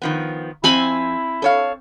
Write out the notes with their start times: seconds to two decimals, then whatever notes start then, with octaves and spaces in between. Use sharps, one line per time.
0.02 D#3 F3 B3
0.64 F2 C4 E4 G#5 B5
1.42 A4 C#5 F5